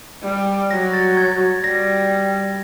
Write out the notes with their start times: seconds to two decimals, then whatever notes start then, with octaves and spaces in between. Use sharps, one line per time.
0.23 G3
0.71 F#3 A#6
0.93 A6
1.17 G#6
1.64 G3 A#6